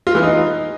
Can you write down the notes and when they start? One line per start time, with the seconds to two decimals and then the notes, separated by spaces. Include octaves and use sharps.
0.07 F4
0.15 E3
0.23 D#4